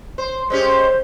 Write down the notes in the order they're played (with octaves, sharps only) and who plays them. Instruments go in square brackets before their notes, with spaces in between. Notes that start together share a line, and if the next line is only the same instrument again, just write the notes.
[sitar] C5
[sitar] G#3 C#4 G4 [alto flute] C5